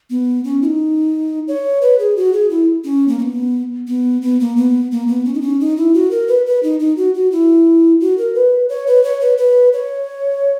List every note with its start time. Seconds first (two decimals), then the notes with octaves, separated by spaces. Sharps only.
0.10 B3
0.44 C#4
0.62 E4
0.65 D#4
1.48 C#5
1.82 B4
1.99 G#4
2.17 F#4
2.33 G#4
2.50 E4
2.84 C#4
3.08 A#3
3.19 C#4
3.22 B3
3.87 B3
4.22 B3
4.40 A#3
4.57 B3
4.91 A#3
5.08 B3
5.25 C#4
5.34 D#4
5.41 C#4
5.60 D#4
5.77 E4
5.94 F#4
6.11 A#4
6.28 B4
6.46 B4
6.63 D#4
6.80 D#4
6.97 F#4
7.14 F#4
7.32 E4
8.01 F#4
8.18 A#4
8.35 B4
8.69 C#5
8.87 B4
9.04 C#5
9.21 B4
9.38 B4
9.73 C#5